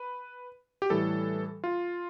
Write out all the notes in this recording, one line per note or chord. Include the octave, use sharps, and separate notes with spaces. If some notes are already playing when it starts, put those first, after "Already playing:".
Already playing: B4
G4
A2 E3 G3 A4
F4